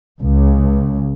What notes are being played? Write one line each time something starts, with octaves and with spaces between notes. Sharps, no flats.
C#2